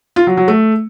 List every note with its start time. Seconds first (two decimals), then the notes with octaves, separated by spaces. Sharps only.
0.16 F4
0.27 F#3
0.37 F#3
0.48 A3